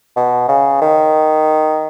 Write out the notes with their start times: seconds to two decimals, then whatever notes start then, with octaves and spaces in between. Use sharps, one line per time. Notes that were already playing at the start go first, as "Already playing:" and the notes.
0.16 B2
0.49 C#3
0.81 D#3